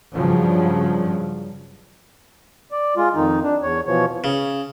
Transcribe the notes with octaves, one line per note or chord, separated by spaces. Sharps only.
G2 C#3 F3 F#3
D5
G#3 F4
F2 D#3 D#4
D4
E2 C#5
B2 E3 F3 C#5
C#3